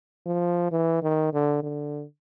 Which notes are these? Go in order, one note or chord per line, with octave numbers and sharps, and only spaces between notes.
F3
E3
D#3
D3
D3